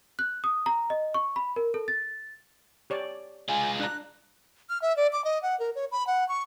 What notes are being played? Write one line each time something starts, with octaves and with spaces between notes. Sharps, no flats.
F#6
D#6
A#5
D#5
C#6
B5
A#4
A4
A6
G4 C#5 D5
G#3 F4 G#5
D4 A#5 F#6
F6
E5
D5
D6
D#5
F#5
A#4
C#5
B5
F#5
C#6